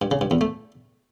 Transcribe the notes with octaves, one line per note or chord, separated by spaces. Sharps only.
G2
C#3
G2
E2
A3